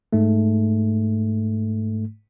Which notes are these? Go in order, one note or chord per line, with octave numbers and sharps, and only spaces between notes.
G#2 A3